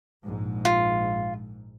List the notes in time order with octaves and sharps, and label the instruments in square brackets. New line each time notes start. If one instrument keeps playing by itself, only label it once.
[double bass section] A#1 G#2
[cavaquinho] F4